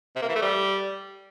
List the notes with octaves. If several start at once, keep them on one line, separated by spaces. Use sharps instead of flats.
C3
A#3
E3
A3
G3